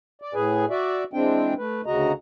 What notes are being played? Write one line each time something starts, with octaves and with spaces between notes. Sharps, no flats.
D5
A2 G#4 B4 G#5
F#4 D5 E5
E3 G#3 C4 D4 G5
A3 B4
D2 C#3 F#4 D#5 A#5